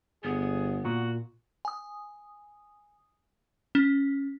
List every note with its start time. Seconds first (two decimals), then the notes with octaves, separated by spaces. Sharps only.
0.24 G1 B3 G#4
0.85 A#2 F#4
1.65 G#5 D#6
3.75 C#4